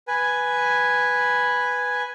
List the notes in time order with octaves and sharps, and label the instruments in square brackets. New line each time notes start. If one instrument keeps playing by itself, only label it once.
[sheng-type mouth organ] B4 G#5